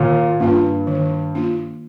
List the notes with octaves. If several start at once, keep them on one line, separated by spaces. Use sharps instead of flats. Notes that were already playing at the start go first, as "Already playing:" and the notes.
Already playing: A#2 D#3
G2 A#3 D4 F4
D#3
A#3 D4 F4